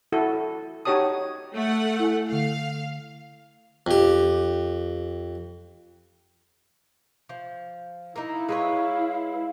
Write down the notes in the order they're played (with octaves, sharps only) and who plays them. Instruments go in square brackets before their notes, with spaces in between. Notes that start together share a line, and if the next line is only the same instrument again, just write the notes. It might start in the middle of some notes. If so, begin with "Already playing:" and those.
[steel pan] E4 F#4 A4
D#4 F#4 G4 C#5 A5 D#6
[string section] A3 F#5
[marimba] E4 G#5
[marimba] D3 A3 [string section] F5
[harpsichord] F2 G4
[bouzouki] F3
[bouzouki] A#3 D#4 [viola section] E4
[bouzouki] G#3 B4 C#5 [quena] F5